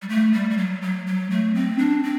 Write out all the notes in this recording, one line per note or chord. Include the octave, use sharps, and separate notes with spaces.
G3
A3
G3
G3
F#3
F#3
F#3
A3
C4
D4
C4